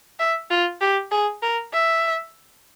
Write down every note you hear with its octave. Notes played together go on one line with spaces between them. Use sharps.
E5
F4
G4
G#4
A#4
E5